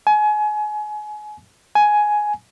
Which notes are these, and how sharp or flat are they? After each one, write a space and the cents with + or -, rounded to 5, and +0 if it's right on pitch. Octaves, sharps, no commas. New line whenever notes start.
G#5 +30
G#5 +10